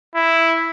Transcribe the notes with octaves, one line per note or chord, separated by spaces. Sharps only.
E4